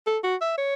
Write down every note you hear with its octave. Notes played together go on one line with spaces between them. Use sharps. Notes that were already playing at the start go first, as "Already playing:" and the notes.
A4
F#4
E5
C#5